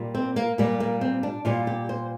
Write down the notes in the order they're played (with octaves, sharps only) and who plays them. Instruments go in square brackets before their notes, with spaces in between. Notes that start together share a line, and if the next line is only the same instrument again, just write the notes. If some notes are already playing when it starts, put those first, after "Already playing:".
Already playing: [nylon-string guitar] A#2 G3
C4
A#3
A#2 G3 A#3
A#3
C4
D4
A#2 G3 F4
G4
C5